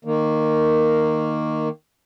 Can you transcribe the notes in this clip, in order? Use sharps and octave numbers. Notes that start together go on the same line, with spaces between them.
D#3 A#3